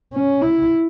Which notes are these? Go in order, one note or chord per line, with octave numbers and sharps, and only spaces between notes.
C#4
E4